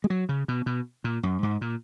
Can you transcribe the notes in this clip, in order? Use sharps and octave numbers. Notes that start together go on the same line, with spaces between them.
G#3
F#3
C#3
B2
B2
A#2
F#2
G#2
A#2